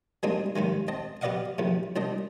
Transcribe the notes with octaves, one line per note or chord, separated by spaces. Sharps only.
G3 G#3 A#3 C4 D4 D#4
D#2 G#2 D#3 G#3
C4 D#5 A5
G4 B4 D5 D#5 F5 F#5
A#1 E2 C3
C2 G3 D4 D#5